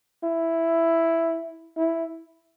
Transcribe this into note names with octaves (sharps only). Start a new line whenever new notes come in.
E4
E4